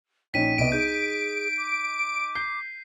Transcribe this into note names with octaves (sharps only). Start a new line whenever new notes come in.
A#1 C#4 D#4 G5 B6 D#7
C2 B3 D#5 D7
D#4 G#4 G6
D6
G6 C7